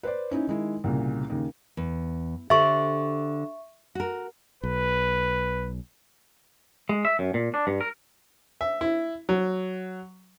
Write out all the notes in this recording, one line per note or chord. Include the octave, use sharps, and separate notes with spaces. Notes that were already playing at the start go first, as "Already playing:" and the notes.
B4 C5 D5
C#4 D#4 E4
D#3 G#3 E4
C2 A#2 C#3
D#2 C#3
E2
D3 G4 C5 E5 C#6
F#4 A#4
B1 B4
G#3
E5
F#2
A#2
D4
G2
A#4
E5
E4
F#3